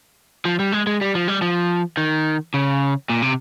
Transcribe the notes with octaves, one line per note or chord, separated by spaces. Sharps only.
F3
G3
G#3
G#3
G3
F3
G3
F3
D#3
C#3
A#2
C3